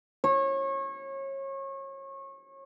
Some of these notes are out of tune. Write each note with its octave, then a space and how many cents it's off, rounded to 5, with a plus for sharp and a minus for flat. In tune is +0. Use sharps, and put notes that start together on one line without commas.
C#5 -30